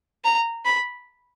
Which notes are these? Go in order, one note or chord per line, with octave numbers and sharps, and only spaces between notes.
A#5
B5